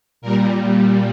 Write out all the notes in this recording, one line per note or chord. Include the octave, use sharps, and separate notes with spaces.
A#2 G3 A#4